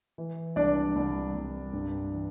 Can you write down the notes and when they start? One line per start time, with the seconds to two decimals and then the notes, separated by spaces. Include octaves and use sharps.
0.18 E3
0.56 C2 D4 D5
0.96 C2
1.34 C2
1.73 G2
2.12 E3